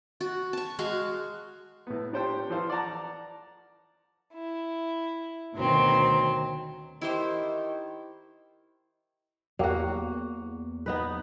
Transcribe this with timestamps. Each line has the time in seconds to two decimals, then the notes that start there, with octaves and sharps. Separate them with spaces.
0.21 F#4
0.53 A5 C#6
0.79 G#3 F#4 F5 C#6
1.87 A2 B3
2.13 D4 G4 C5 C#5 G5
2.50 E3 F3 A4 C5 F5
2.70 D5 F#5 A5 A#5
4.33 E4
5.55 D2 B2 D#3 F#3 C4 C6
7.01 D#3 E4 G4 C5
9.59 E2 F#3 A#3 F#4 G4
10.86 B3 D#4 B4